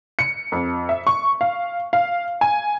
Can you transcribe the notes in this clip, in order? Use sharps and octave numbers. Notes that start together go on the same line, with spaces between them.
C#7
F2
E5
C#6
F5
F5
G#5